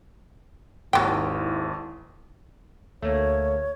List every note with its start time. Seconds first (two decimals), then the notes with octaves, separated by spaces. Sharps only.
0.93 G#1 D#2 G#2 F#3 E4 G5
3.02 D2 A3 A#3 C#5